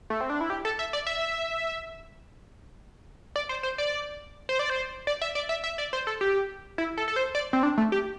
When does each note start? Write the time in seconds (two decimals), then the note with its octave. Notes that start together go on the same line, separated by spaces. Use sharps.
0.10 A3
0.21 C4
0.30 D4
0.41 E4
0.50 G4
0.65 A4
0.79 E5
0.93 D5
1.07 E5
3.36 D5
3.49 C5
3.63 C5
3.78 D5
4.49 C5
4.59 D5
4.70 C5
5.07 D5
5.22 E5
5.35 D5
5.49 E5
5.64 E5
5.78 D5
5.93 C5
6.07 A4
6.21 G4
6.78 E4
6.98 A4
7.08 A4
7.16 C5
7.35 D5
7.53 C4
7.63 D4
7.78 A3
7.92 G4